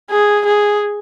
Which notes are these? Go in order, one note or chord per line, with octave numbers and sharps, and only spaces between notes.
G#4
G#4